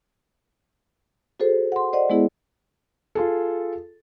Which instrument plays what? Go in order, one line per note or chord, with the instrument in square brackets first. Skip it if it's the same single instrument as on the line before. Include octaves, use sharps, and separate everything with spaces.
[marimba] F#4 G#4 A4 C5
F#5 C6
C5 D5 D#5 F#5
G#3 B3 E4 G#4
[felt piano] F4 G#4 A4